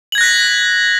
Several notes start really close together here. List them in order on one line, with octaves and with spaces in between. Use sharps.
F#7 G#6 A#6 F#6 B6